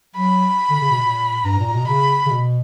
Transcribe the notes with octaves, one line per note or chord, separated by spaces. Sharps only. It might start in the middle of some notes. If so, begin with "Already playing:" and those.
F#3 B5
D3
C#3
B2
A#2
G2 A#5
A#2
B2
C#3 B5
C#3
B2